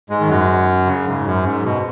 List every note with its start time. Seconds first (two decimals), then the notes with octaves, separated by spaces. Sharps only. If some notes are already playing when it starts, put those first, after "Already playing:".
0.10 G#2 G#3
0.20 D#3
0.28 F#2 F#3
0.86 C#3
1.06 G#2
1.24 F#2
1.44 G#2
1.64 B2